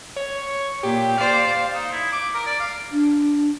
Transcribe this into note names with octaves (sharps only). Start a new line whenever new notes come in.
C#5
A#2 G4
C5 D5 F5
D#4
E4
D6
A#4
D5
F5
D4